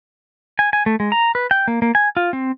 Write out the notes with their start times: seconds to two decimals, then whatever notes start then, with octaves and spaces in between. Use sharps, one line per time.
0.59 G#5
0.73 G#5
0.86 A3
1.00 G#3
1.12 A#5
1.35 B4
1.51 G5
1.68 A#3
1.82 A#3
1.95 G#5
2.17 F4
2.33 C4